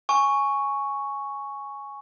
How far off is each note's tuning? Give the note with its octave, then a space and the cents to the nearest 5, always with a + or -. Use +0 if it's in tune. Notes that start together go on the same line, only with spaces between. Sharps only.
G#5 +0 C#6 +0